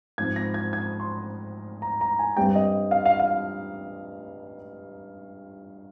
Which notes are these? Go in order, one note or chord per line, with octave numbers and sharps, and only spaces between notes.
G#2 F3 C4 G#6
A#6
G#6
G#6
C6
A#5
A#5
G#5
G2 G3 C4 G5
D#5
F5
F5
F5